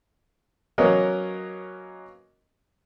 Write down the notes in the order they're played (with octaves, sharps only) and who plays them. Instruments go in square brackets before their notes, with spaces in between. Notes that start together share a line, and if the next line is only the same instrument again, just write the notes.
[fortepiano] F#3 A#3 B3 C#4 A#4 D#5